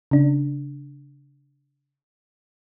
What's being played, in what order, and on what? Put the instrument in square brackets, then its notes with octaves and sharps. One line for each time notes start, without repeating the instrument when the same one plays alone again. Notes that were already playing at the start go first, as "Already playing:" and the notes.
[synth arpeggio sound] C#3 D4